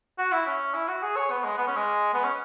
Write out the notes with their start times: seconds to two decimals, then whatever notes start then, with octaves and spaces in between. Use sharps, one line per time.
0.18 F#4
0.32 E4
0.46 C#4
0.74 E4
0.88 F#4
1.02 G#4
1.16 C#5
1.30 B3
1.44 G#3
1.58 B3
1.67 C#4
1.76 G#3
2.14 B3
2.24 C#4